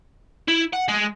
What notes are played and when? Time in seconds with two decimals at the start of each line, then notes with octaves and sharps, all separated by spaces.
0.48 E4
0.73 F#5
0.88 G#3